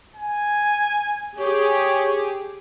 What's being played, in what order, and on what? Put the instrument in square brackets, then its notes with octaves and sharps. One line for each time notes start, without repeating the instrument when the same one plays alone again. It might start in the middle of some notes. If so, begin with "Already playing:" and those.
[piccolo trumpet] G#5
[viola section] G4 G#4 [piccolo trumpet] C#5